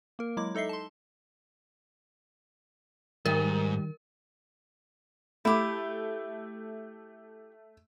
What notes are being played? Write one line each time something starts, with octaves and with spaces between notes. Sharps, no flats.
A#3 A#4
F#3 G#3 E4 D6
D#4 A4 D#5 E5 C7
A5 C6
G#2 D#3 G3 A#4 E5
A3 E4 G4